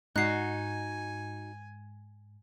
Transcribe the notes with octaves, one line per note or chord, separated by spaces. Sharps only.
G#2 D#4 F#4 G#5 F#6 C7